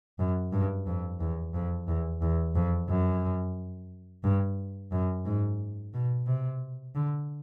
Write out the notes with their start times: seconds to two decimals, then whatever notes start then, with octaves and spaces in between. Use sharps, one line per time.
0.19 F#2
0.52 G2
0.87 F2
1.20 E2
1.54 F2
1.88 E2
2.22 E2
2.55 F2
2.89 F#2
4.24 G2
4.92 F#2
5.25 G#2
5.94 B2
6.27 C3
6.95 D3